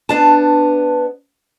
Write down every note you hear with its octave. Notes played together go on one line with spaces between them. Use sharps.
B3 D4 A5